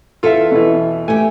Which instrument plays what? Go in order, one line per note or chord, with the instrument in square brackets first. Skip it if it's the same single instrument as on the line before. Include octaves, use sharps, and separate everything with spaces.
[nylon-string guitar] E2 A4 [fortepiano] F4 E5
[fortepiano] B2 E3
[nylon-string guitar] A3 G4 [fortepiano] G#5